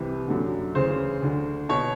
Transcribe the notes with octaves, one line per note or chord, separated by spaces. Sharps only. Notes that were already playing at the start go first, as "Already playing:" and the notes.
Already playing: C2 C3 E3
F#2 D3
D2 C#3 E3 C5
D2 D3
B2 C#5